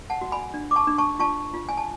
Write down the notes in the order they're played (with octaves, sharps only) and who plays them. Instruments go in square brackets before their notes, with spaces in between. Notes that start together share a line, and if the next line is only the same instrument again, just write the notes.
[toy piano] F#5 A5
F#4
G#5 B5
D4
D6
A5 C#6
D4
A5 C#6
F4 A5 C#6
F4
G#5
A5